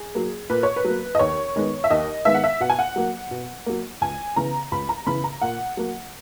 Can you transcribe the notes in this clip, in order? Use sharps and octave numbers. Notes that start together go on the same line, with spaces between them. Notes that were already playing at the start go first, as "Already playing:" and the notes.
Already playing: G#4
F#3 A#3
A#2 B4
C#5
B4
F#3 A#3
D#5
D#2 C#5
D#3 G#3 B3
E5
D#2 D#5
D#3 G#3 B3 E5
F#5
E5
B2 F#5
G#5
F#5
F#3 A#3
B2
F#3 A#3
C#2 G#5
C#3 E3 B3 A#5
C#2 B5
A#5
C#3 E3 B3 B5
A#5
A#2 F#5
F#3 A#3